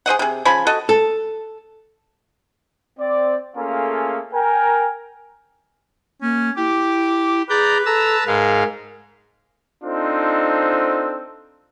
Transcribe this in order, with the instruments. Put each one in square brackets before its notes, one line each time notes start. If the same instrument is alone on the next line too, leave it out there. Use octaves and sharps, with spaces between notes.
[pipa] G#4 C5 D#5 F#5
C3 G#4
C#3 F3 G#5 B5
F#4 A4 D#5
[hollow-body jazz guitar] A4
[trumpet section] C4 D5
A3 A#3 C#4 F4 G#4 A4
A#4 G5 G#5
[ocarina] A#3 [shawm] C#4
[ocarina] E4 [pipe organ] G4 [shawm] D6
[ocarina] G#4 [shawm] B4 [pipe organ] D5 A#5 G6
[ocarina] A4 [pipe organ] A5 A#5 E6
[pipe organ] G#2 G#3 F5 [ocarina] A#4
[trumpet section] C4 D4 D#4 F4 A4 C5